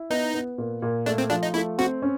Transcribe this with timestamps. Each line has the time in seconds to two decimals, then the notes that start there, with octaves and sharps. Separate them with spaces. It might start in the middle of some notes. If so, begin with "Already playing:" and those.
Already playing: E4
0.10 B3 D#4
0.34 B3
0.58 A#2
0.82 A#2
1.06 A3 D4
1.18 C4
1.30 F3 D4
1.43 D#4
1.54 A3 E4
1.78 C4 F#4
2.02 C#4